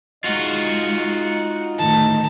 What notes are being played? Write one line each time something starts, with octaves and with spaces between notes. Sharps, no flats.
G#3 D#4 F4 F#4 D#5
D2 A2 D#3 A5